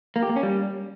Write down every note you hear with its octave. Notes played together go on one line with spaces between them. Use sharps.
A#3
G4
A#3
C#4
G3